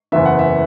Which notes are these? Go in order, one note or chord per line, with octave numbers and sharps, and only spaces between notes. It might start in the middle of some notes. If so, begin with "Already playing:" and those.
F#1 E2 E3 B3 E5
F#5
E5